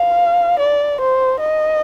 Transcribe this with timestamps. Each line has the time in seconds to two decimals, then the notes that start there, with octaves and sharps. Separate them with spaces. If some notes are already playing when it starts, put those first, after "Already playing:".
Already playing: F5
0.59 D5
1.00 C5
1.40 D#5